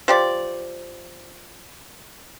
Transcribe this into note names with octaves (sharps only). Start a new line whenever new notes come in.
F3 G4 D5